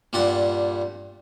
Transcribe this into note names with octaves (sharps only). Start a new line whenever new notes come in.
G2 A#2 G3 D4 F#5 A5